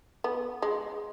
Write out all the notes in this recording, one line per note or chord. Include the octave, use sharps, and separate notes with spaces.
B3
G#3